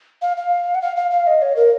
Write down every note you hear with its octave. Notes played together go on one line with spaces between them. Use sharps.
F5
F5
F#5
F5
F5
F5
D#5
C#5
A#4